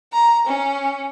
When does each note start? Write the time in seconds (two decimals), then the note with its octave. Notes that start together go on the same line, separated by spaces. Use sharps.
0.14 A#5
0.47 C#4